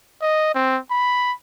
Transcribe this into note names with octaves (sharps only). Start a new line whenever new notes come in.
D#5
C4
B5